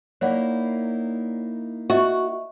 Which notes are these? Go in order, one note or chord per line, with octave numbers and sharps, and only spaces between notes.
A#3 D#4 E4 C#5 D5 F#5
F#4 D#5 E5 C#6